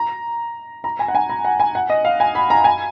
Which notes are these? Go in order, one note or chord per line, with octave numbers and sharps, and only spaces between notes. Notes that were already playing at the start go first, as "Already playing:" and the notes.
Already playing: A#5
A#5
G#5
F#5
G#5
A#5
F#5
G#5
F#5
D#5
F5
G#5
B5
A#5
G#5